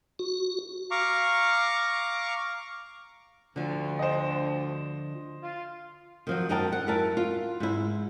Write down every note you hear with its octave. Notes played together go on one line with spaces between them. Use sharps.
F#4
F5 A#5 C#6 D6
D2 D3 F3
C5 D#5
F4
D#3 F3 F#3
F#2 D#4 F#4 A#4 G5 A5
F#5
F#2 E4 A#4 E5 A5
F4
G#2 E4